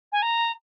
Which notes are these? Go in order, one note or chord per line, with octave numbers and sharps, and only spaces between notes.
G#5
A#5